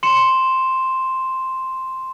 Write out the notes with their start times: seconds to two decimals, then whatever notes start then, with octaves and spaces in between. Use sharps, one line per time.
0.03 C6 C#7 E7